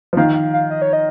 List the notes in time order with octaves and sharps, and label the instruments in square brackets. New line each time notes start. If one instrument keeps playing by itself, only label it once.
[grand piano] F3
[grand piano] D#3 [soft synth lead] F5
[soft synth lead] F5
F5
D#5
C#5
D#5